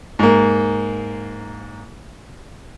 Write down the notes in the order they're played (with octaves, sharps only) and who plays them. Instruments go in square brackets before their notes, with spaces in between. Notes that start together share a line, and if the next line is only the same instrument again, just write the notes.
[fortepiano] G#2 A#3